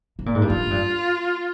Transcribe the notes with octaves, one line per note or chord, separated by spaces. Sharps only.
C3
A#2
G#2
G2
F2 F4
G#2
G2